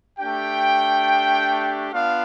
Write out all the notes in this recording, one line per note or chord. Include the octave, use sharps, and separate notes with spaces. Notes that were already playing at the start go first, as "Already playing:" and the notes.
A3 D4 G4 G5
B3 D4 F4 F5